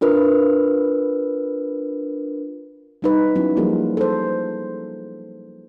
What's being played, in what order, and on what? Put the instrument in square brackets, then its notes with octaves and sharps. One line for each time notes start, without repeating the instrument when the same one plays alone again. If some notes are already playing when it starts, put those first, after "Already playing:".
[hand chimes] D4 F4 A#4 B4
[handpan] G3 D#4 B4
F#3 B3 C#4 E4
F3 G3 A#3 F4 G#4 A#4
A4 C5